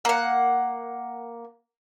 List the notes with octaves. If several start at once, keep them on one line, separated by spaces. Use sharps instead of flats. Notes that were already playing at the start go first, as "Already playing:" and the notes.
A#3 F#5